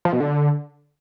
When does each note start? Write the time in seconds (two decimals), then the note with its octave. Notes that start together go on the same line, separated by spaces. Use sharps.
0.05 F3
0.13 B2
0.20 D3